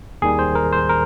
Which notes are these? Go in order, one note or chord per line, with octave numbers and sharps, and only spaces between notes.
D#2 D#3 G3 G#4
C5
A#4
C5
A#4